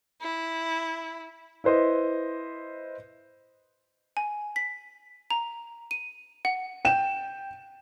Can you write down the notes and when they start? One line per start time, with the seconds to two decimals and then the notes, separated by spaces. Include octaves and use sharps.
0.21 E4
1.64 E4 B4 C5 D#5
4.17 G#5
4.56 B6
5.31 A#5
5.91 D#7
6.45 F#5
6.85 G5 E7